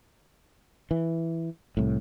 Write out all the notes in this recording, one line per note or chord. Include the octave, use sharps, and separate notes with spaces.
E3
C2 A2